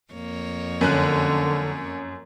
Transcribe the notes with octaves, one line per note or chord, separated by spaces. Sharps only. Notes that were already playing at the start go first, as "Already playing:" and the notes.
F2 A#3 C#5
F#2 D3 C#4 F#6